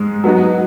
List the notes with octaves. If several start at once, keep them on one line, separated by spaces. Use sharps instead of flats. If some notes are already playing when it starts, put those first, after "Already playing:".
Already playing: G#2 G#3
F#3 B3 D#4 F#4